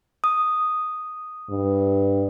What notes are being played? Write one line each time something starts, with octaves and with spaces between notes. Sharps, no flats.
D#6
G2